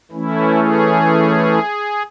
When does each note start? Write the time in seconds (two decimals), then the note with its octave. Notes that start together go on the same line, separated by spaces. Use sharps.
0.11 E3 A3 C#4 E4
0.58 G#4